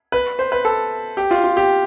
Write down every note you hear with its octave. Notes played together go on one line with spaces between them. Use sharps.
B4
C5
B4
A4
G4
F4
F4
G4